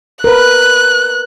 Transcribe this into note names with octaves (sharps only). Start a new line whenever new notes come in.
A#4 B4 F#6